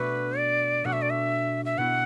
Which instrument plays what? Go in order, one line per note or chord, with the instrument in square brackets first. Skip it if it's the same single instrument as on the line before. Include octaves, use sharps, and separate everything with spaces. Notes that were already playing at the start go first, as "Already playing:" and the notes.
Already playing: [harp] B2 A3 D4 F#4 [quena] B4
[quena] D5
[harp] B2 A3 D4 F#4 [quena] F#5
[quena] E5
D5
E5
E5
[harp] B2 B3 E4 [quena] F#5